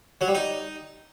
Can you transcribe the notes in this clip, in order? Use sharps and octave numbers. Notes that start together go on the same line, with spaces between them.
F#3
G3
D#4